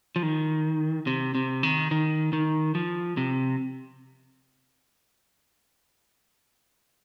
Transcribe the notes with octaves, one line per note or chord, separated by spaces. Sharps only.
F3
D#3
C3
C3
D#3
D#3
D#3
F3
C3